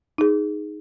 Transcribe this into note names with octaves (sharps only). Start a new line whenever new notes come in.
D#4 G#4